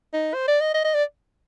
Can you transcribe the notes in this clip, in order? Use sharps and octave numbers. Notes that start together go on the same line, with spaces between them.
D#4
C5
D5
D#5
D#5
D#5
D5